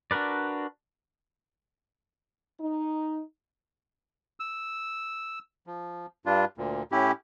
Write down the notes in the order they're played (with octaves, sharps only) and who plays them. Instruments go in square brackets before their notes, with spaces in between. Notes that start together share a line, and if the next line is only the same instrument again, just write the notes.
[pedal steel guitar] D4 F#4 A#4 B4 D5
[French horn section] D#4
[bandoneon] E6
F3
G2 G3 D4 F4
D2 A#2
A2 C#4 E4 G4